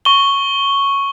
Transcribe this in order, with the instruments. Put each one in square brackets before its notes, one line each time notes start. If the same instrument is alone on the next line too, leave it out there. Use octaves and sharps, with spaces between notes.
[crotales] C#6 G7